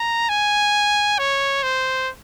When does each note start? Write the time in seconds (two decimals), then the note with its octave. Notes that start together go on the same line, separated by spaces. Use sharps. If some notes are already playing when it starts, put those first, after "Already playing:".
Already playing: A#5
0.29 G#5
1.18 C#5
1.63 C5